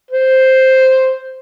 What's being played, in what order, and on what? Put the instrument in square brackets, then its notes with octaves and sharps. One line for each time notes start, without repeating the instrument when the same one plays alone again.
[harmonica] C5